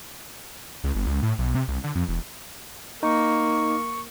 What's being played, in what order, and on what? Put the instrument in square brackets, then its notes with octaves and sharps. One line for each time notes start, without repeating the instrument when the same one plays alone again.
[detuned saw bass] C#2
G1
C#2
A2
B1
C3
C2
D3
F2
E1
[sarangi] A#3 [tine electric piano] D#4 [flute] C#6